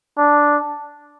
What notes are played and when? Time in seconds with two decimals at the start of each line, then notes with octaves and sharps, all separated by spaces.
0.18 D4